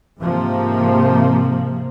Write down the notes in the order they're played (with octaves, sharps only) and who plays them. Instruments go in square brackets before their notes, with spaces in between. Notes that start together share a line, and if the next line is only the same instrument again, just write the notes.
[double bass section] G#2 C3 F3 A#3